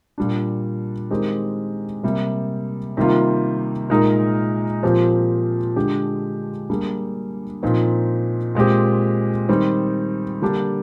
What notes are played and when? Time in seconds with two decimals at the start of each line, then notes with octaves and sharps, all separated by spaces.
0.18 A#2 G3 D4
1.10 D#3 G#3 C4 G4 A#4
2.03 C3 G3 A#3
2.97 C3 D#3 G3 A#3 F4
3.90 A#2 G#3 D#4 A#4
4.83 A#2 F3 C4 G4
5.76 D3 G#3 D4 G4
6.70 G3 A#3 D4 G#4
7.63 A#2 F3 C4 D#4
8.55 A#2 G#3 C4 G4
9.49 D#3 G3 C4
10.42 D3 G3 A#3 D4 G4